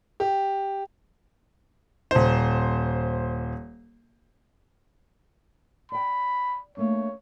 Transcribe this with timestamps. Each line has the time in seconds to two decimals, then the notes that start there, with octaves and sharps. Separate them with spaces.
0.20 G4
2.11 D#1 C5
5.92 D5 G5 B5
6.77 A3 A#3 D4 C#5